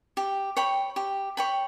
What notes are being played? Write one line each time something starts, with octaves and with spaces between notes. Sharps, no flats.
G4
C#5 G5 B5
G4
C#5 G5 B5